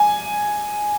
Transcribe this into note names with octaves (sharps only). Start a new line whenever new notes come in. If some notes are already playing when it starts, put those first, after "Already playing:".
Already playing: G#5